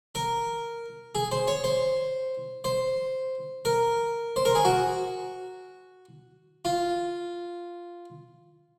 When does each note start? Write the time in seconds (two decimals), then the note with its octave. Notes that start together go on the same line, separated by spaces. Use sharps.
0.15 A#4
1.15 G#4
1.32 C5
1.48 C#5
1.64 C5
2.64 C5
3.65 A#4
4.36 C5
4.45 A#4
4.55 G#4
4.65 F#4
6.65 F4